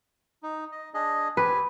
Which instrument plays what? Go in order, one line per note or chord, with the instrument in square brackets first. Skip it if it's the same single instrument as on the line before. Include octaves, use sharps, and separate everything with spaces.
[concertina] D#4
D#5
D4 G#4 D#5
[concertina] C4 G4 G#5 [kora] B4